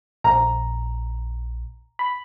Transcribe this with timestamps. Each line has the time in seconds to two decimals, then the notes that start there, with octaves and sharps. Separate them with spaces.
0.24 A#1 A#5
1.99 B5